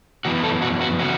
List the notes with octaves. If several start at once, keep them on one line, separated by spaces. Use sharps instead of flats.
F#2 E3 B3 E4 F#4
A4
F#4
F#4
C#3 E3 F#4